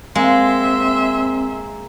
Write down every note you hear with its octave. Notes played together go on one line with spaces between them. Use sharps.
G#3 A#3 C4 E5 C6